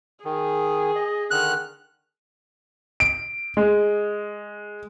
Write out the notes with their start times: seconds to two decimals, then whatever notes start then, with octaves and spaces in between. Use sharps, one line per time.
0.25 D#3 G#4
0.96 D#5
1.31 D3 D#3 F6 F#6
3.00 D7
3.57 G#3